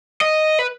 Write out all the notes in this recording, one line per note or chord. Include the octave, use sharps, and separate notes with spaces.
D#5
B4